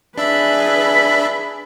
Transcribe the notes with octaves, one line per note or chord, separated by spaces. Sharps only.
D4 G#4 B4 E5 B5